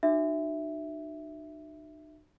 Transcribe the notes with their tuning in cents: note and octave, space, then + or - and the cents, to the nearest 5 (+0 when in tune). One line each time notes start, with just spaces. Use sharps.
D#4 -40 F#4 +0 E5 +0